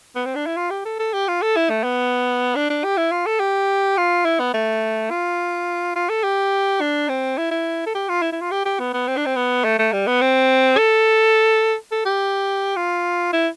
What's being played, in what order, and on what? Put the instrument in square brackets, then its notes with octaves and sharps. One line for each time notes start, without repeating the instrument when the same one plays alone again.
[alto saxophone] B3
C4
D4
E4
F4
G4
A4
A4
G4
F4
A4
E4
A3
B3
D4
D4
G4
E4
F4
A4
G4
F4
E4
B3
A3
F4
F4
A4
G4
D4
C4
E4
E4
A4
G4
F4
E4
E4
F4
G4
G4
B3
B3
C4
D4
C4
B3
A3
A3
G3
B3
C4
A4
A4
G4
F4
E4